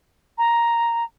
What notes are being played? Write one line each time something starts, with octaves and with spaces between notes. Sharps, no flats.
A#5